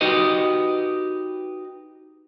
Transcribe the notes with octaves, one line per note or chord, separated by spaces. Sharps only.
D#4 F#4 G4 B4 D#5